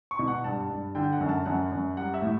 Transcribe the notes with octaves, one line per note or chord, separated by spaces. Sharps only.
C#6
B2
F#5
G2 A5
G2
D3 G5
F#5
F#2
A5
F#2 F#5
F#2
G3 F#5
E5
A2